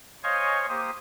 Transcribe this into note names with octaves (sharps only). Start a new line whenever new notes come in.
C5 C#5 D#5 F5 G#5 C#6
A#3 G4 C5 D#6